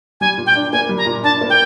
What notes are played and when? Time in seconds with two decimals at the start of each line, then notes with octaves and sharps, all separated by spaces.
0.21 G3 G#5
0.38 A#2
0.46 G5
0.56 D4
0.72 A#3 G#5
0.89 G3
0.98 A#5
1.06 A#2
1.24 D4 A5
1.41 A#3
1.50 G5